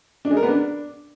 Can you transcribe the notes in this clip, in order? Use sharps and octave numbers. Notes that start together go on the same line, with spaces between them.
D4
G#3
A#4
B3
D4